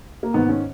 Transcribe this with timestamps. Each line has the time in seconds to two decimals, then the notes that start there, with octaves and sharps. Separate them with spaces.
0.23 A#3
0.34 G#2 D#3 B3
0.49 C#4